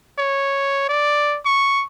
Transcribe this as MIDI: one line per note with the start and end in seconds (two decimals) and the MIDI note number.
0.19 0.87 73
0.89 1.38 74
1.45 1.85 85